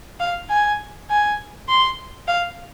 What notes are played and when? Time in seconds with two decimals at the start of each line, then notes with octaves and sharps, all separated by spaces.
0.20 F5
0.50 G#5
1.10 G#5
1.69 C6
2.28 F5